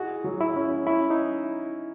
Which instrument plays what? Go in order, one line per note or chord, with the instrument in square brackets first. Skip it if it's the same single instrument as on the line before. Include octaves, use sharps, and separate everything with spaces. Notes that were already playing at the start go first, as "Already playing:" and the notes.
Already playing: [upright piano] D#4 G#4 [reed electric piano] E4 F#4
[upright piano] F#3
[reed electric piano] E4
[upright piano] C#4
[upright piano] C#4 [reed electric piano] E4
[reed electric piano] D#4